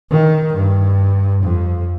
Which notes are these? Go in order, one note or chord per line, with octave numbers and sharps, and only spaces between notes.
D#3
G2
F2